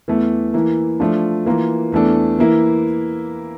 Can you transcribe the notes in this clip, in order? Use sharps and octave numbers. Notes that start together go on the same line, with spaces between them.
E2 E3 A3
E3 A#3 E4
F3 A3 D4 F4
E3 A#3 F4 A#4
E2 E3 A3 D4 A4
E3 A#3 E4